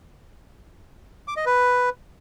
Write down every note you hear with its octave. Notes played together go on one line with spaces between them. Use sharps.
D6
D#5
B4